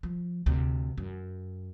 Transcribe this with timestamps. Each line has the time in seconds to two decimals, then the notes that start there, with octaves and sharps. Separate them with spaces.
0.03 F3
0.46 D2 C3
0.98 F#2